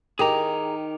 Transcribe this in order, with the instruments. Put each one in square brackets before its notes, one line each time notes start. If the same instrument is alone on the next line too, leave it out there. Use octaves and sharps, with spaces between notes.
[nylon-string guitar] D#3 [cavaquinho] G4 [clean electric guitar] G#4 A#5